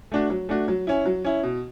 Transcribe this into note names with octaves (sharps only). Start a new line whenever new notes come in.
A3 D4 F#4
F#3
A3 D4 F#4
F#3
C#4 E4
F#3
C#4 E4
B2